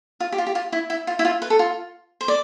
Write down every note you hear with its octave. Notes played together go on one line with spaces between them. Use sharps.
F4
G4
F4
G4
F4
E4
E4
F4
E4
F4
B4
A4
F4
C5
D5